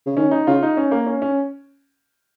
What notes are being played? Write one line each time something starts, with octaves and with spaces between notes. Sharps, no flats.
C#3
D#3 C#4
D#4
C#3 F4
D#4
C#4
A#3
C#4
C#4